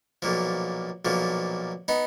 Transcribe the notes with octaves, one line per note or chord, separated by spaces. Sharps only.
B1 A#2 F3
B1 A#2 F3
B3 D#4